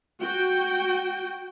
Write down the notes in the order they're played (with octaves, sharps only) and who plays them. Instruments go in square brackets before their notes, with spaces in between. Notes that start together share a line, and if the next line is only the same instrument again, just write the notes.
[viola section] F#4 G5